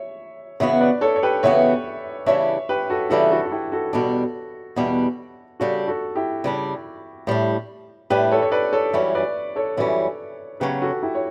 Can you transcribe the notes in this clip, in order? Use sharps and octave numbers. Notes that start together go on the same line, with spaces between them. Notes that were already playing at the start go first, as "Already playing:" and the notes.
Already playing: C#5 E5
C#3 E3 B3 F#4 C#5 E5
B4 D5
A4 C#5
C#5
G4 B4
C#3 E3 B3 F#4 C#5 E5
C#3 E3 G3 D4 C#5 E5
G4 B4
F#4 A4
C#3 E3 G3 D4 F#4 A4
F#4 A4
F#4
E4 G4
F#4 A4
E2 B2 G3 D4 F#4 A4
E2 B2 G3 D4
C#3 G3 D4 F#4 A4
F#4 A4
E4 G4
C#3 G3 D4
A2 G3 D4
A2 G3 D4 G4 B4
A4 C#5
C#5
B4 D5
A4 C#5
F#2 E3 G3 C#4 C#5 E5
B4 D5
A4 C#5
F#2 E3 G3 C#4 A4 C#5
C#3 F#3 C#4 G4 B4
F#4 A4
E4 G4
C#5